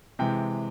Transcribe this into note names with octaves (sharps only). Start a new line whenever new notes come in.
C3 E3 G#3 G5